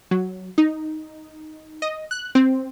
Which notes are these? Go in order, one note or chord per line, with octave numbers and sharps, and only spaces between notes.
F#3
D#4
D#5
F#6
C4